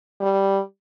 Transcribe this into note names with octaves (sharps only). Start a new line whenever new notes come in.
G3